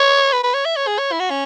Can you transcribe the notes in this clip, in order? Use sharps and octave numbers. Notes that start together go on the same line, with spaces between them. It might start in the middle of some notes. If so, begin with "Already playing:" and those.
Already playing: C#5
B4
B4
C#5
E5
C#5
G#4
C#5
E4
F#4
C#4